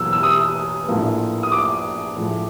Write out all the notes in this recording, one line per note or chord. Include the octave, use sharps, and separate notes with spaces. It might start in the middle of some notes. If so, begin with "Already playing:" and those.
Already playing: E2 B2 F#3 A#3 E6
E6
D#6
A#1 A2 F3 A#3
D#6
D6
A2 F3 G#3